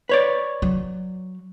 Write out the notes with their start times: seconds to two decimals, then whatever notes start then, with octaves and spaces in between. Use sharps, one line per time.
0.09 B4 C#5 D5
0.62 F#3